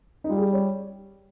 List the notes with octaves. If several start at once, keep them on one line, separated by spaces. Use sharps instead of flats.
D#4
G3 F4
G#4
G4
C#5